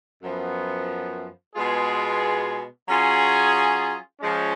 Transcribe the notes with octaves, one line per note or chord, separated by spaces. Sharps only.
F#2 F3 B3
B2 G#3 B3 F4 G#4
F#3 C#4 F4 G#4
F3 G#3 C#4